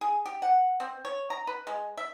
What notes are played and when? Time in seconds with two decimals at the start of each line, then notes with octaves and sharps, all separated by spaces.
0.01 G#4
0.26 G4
0.42 F#5
0.80 C4
1.05 C#5
1.30 A#5
1.47 B4
1.67 G#3
1.97 E5